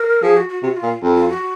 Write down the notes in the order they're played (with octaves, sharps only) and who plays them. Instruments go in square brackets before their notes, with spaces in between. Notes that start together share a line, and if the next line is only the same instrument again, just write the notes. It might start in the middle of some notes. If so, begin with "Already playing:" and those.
Already playing: [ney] A#4
[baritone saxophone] F3 [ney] G#4
[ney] F#4
F#4
[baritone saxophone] C3 [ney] F#4
[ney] F4
[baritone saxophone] A#2
F2
[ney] F4
F#4